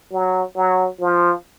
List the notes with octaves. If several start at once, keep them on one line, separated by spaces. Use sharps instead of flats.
F#3
F#3
F3